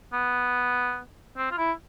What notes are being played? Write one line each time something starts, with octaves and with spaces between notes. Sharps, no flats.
B3
C4
F4
E4